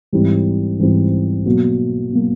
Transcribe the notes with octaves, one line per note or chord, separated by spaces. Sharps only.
G#2 E3 G3 C4 E4
G#2 E3 G3 C4 E4
B2 F#3 A#3
B2 F#3 A#3